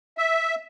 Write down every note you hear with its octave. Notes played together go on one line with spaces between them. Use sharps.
E5